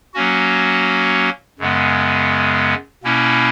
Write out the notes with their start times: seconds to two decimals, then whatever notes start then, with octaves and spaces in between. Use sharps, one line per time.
0.14 F#3 A#3 C#4 F#4
1.59 F#2 C#3 G#3 B3
3.04 B2 A#3 C#4 E4